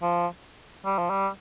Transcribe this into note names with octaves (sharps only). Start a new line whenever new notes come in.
F3
G3
F3
G3